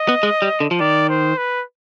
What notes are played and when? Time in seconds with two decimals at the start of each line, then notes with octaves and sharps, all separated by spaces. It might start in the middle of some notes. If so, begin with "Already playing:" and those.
Already playing: D#5
0.09 B3
0.23 G#3
0.42 G3
0.60 D3
0.71 F3
0.80 D#3 D5
1.09 C5
1.38 B4